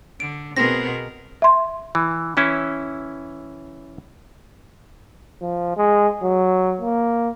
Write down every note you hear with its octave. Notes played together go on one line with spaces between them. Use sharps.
D3 D7
B2 B3 C4 G#4 A#4 A#6
E5 C6
E3
E3 C#4 E4
F3
G#3
F#3
A#3